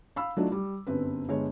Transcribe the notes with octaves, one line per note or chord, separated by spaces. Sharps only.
F5 B5 E6
F#3 A3 D4 D#4 F4
G3
G1 F#2 C4 B4
G1 G#3 C#5